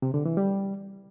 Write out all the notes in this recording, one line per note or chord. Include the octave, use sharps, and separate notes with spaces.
C3
D3
E3
G3